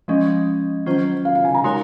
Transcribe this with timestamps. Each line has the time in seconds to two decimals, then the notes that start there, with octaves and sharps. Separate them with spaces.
0.08 F3 G#3 C#4 D#5
0.86 D#3 F#3 C#4 F4 C5
1.25 F5
1.35 F5
1.45 G#5
1.54 A#5
1.64 G#3 D#4 F#4 A#4 C#5 C6